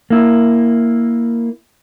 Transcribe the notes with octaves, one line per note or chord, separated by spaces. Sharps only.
A#3 E4